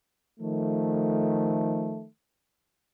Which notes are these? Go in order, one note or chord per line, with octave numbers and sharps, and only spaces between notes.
D#3 F3 A3